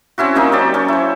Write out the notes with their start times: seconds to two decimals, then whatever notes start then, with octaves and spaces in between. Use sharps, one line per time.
0.18 C4 C#4 E4 F#4
0.35 A#3 C4 D#4 G4
0.52 F#3 C#5 D5 G5
0.74 C#4 C#6
0.88 E4 C5